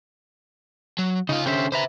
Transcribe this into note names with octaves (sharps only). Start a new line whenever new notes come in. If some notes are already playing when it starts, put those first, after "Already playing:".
F#3
C#3 D#4 F4
D3 C#4 G4 C5 E5
D3 B4 C5 E5 A#5